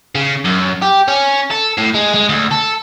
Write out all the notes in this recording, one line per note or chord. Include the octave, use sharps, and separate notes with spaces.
C#3
F#2
G4
C#4
A4
A2
G#3
G#3
D2
A4